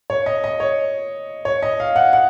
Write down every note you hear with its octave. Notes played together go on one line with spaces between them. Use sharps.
C#5
D#5
D#5
C#5
C#5
D#5
F5
F#5
F#5